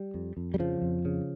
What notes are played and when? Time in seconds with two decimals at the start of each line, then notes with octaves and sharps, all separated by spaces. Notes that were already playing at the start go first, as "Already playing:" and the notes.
Already playing: G3
0.14 F2
0.37 F2
0.54 G3
0.59 C#3 F3
0.82 F2
1.05 C#3